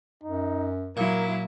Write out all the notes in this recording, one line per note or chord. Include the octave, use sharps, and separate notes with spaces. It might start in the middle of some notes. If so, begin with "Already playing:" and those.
F#2 D#4
A#2 F#3 E4 A#4